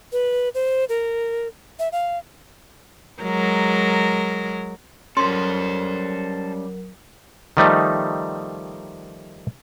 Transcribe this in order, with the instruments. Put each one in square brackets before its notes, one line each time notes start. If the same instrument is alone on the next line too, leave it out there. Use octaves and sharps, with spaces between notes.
[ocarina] B4
C5
A#4
E5
F5
[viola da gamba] F#3 G#3 A#4
[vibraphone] F#3 A#4 [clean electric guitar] G3 C#4 [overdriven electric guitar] A4 C5 [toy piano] C6
[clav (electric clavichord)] D#3 F3 G3 A3 D#4